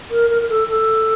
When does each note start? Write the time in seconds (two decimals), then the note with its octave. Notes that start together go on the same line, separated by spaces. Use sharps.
0.11 A#4
0.30 A#4
0.42 A#4
0.49 A4
0.68 A4